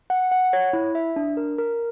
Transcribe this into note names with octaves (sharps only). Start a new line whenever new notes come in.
F#5
F#5
C#5
E4
E5
D4
A#4
A#4